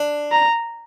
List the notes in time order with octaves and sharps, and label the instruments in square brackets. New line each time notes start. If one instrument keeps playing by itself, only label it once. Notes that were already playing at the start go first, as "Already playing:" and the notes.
Already playing: [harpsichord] D4
[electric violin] A#5